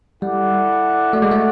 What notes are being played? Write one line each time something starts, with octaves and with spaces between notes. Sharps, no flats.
G3 E4 A4 D5 F#5
A3 F#4 A4 D5 F#5
G#3
A3